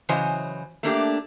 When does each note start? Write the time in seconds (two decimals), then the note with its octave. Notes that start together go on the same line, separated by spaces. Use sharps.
0.09 C#3 E3 F#3 C5 D#5 G#5
0.83 A3 A#3 D4 G4